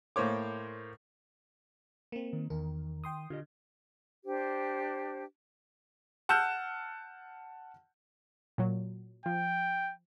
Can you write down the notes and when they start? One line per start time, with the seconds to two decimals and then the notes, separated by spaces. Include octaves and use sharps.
0.16 A2 A#3 C5 C#5 D6
2.12 A#3 C4
2.33 D#3
2.50 E2 D#3 A#4
3.04 G5 C6 D#6
3.30 D3 F4 G4 D#5
4.25 D4 G4 C5
6.29 F#5 A5 E6 F6 G6 E7
8.58 A#2 F#3
9.26 F3 G5